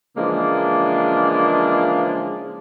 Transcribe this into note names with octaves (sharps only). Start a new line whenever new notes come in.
C#3 E3 F3 G#3 A#3 D4